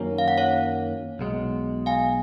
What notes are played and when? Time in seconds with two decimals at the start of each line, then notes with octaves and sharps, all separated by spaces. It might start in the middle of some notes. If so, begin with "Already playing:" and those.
Already playing: F#2 D#3 F#3 A#3 C#4
0.18 F5
0.28 F#5
0.38 C#5 F5
1.19 B1 B2 G#3
1.86 F5 G#5